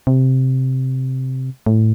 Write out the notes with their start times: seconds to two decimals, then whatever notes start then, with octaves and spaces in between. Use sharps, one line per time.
0.07 C3
1.67 A2